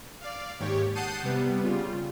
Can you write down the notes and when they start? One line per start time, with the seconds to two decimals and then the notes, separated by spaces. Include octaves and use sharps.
0.21 D5 F5
0.59 D#2 G#2 G4 C#5
0.95 F#5 A5 D#6 G6 C7 D#7
1.23 C3 G3 B3
1.62 C#3 G3 F4